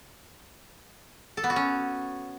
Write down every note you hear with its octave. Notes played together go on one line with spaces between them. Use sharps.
A4
B3
F#4
C#4